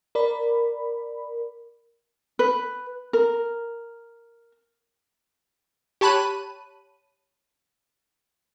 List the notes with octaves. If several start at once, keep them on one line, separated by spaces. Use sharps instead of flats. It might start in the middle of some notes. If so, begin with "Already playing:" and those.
A#4 D5 B5
B4
A#4
G4 C#5 A5 B5 F#6 D#7